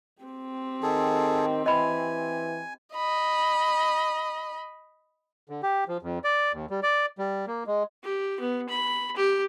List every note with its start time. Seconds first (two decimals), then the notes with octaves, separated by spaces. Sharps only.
0.23 C4 G4
0.83 D#3 G#4 A4
1.66 E3 D#5 G#5 B5
2.95 D#5 B5
5.49 D3
5.63 G4
5.88 F3
6.02 F2
6.24 D5
6.53 D#2
6.70 G3
6.83 D5
7.18 G3
7.47 A#3
7.67 G#3
8.03 G4
8.40 B3
8.69 B5
9.16 G4